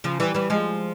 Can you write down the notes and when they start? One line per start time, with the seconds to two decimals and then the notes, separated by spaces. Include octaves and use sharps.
0.04 C#3 F3
0.20 E3 G3
0.34 E3 G3
0.50 F3 G#3